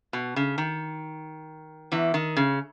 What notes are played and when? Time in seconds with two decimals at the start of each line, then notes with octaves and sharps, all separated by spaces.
0.13 B2
0.36 C#3
0.58 D#3
1.92 E2 E3
2.14 D#3
2.37 C#3